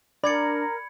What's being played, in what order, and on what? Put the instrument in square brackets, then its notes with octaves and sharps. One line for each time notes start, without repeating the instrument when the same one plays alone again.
[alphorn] D4 [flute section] A#4 [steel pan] D5 [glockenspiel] B5 G#6 C#7